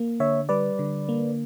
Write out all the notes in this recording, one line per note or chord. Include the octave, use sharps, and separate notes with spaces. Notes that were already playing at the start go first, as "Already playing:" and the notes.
Already playing: A#3
D3 C#5 E5
G3 B4 D5
D3
A#3